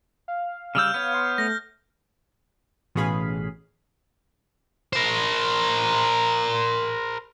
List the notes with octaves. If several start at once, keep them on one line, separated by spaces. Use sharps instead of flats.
F5
C#3 G3 E6 F6 G6
B3 C#5
C6
A3 A#6
A1 B2 C#4 G#4 F5 B5
A#4 C5